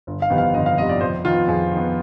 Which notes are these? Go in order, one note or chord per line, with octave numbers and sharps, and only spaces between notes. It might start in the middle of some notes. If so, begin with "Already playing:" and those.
G1
F5
F2 C3 D#3 B3
F5
G1 D#5
F5
F2 C3 D#3 B3 D#5
D5
F2 C5
D#3 B3 F4
F2 G#4
D#3
B3